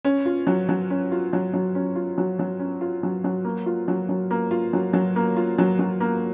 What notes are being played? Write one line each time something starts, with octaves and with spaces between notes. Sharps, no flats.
C#4
F4
F#3
F#3
C#4
F4
F#3
F#3
C#4
F4
F#3
F#3
C#4
F4
F#3
F#3
A#3
F4
F#3
F#3
A#3
F4
F#3
F#3
A#3
F4
F#3
F#3
A#3